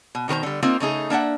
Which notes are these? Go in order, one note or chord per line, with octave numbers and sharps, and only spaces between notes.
B2
B2 D#3 A#4 C5 A#5
D3 G3
A#3 C4 D#4 F4 C5
C#3 A3 D#4 G#4
A#3 D4 E5 F#5